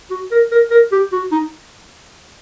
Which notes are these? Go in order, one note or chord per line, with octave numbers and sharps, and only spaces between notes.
F#4
A#4
A#4
A#4
G4
F#4
D#4